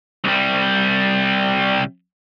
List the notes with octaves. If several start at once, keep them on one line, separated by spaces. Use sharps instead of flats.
C2 G3